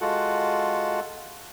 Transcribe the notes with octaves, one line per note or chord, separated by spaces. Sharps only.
G#3 F4 F#4 A4 F#5